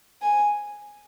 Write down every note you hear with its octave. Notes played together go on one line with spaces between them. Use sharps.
G#5